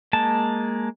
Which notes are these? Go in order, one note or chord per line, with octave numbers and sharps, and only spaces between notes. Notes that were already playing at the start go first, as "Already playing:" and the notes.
G#3 A#3 A5